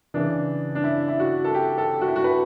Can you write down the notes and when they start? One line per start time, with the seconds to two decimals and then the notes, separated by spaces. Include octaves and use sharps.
0.14 C#3 E3 D4
0.75 D4
0.84 E4
1.08 E4
1.20 F#4
1.44 A4
1.54 G4
1.78 A4
2.01 F#4
2.08 E4
2.16 F#4
2.24 B4